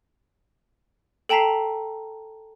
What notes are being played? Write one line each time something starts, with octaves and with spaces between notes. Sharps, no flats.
A4 G5 A5 A#5 B6 C7